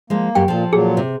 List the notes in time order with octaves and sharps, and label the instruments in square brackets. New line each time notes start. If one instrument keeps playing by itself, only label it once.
[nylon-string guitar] F3 G#3 [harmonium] A#3
[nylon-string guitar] F#2 G4 [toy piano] G5
[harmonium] A#2 [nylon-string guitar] F3 A4
[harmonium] A#2 F#3 [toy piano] G#4
[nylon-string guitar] C3